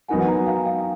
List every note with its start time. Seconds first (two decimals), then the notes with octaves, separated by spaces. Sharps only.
0.08 F#3 B3 D#4 F#4 A#4 F#5 G#5
0.28 G#5 A#5
0.47 F5 G5
0.65 F5 G5